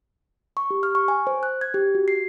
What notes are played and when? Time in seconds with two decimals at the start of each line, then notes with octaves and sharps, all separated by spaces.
0.57 C#6
0.71 G4
0.83 F6
0.95 C#6
1.08 G#5
1.27 C5
1.43 F#6
1.61 G#6
1.74 G4
1.95 F#4
2.08 C7